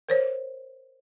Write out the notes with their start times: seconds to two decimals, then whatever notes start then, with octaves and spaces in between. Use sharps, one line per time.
0.09 A#4 C5 C#5